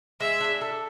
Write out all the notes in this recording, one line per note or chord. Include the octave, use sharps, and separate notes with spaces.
G#3 E5
D4
A4